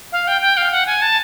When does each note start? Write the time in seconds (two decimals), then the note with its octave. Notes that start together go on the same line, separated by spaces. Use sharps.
0.12 F5
0.27 G5
0.42 G5
0.57 F5
0.72 F#5
0.86 G#5
1.02 A5